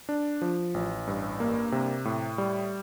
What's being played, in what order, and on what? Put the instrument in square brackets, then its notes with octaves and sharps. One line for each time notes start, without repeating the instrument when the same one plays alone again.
[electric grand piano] D4
F3
A1
G2
A#3
C3
A2
G3